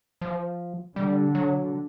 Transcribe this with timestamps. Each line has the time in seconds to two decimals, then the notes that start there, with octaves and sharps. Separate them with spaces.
0.21 F3
0.96 D3 G3
1.35 F#3